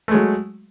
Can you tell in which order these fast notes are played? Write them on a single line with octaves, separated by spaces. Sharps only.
A3 G#3 F#3